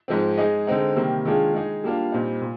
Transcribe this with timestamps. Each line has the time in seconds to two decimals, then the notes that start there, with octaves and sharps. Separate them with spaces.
0.08 G#2 F3 G#3 C4
0.37 G#3 D#4 G#4 D#5
0.67 D3 G#3 C4 D#4
0.96 C3 D#3 G3 A#3
1.25 D#3 G#3 D4 F4 G#4
1.54 G#3 D#4 G#4
1.84 G3 A#3 D4 F4
2.12 A#2 G3 C4 D#4
2.41 A#2